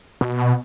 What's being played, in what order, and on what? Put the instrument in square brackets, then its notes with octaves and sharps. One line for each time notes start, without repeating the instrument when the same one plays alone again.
[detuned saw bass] B2